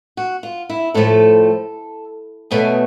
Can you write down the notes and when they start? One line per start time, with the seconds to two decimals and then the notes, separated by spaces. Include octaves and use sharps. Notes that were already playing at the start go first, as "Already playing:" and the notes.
0.17 F#4
0.43 F4
0.69 E4
0.94 A2 F3 A3 A4
2.51 B2 F#3 A3 G#4